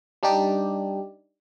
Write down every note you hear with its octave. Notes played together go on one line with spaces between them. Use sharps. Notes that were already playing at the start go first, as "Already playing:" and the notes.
G3 D4 D#4 G4 D5